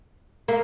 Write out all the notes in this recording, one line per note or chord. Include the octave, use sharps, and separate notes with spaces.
A#3